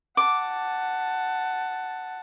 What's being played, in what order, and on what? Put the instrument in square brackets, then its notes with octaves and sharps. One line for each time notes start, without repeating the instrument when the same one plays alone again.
[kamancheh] F#5 A5 [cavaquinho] D6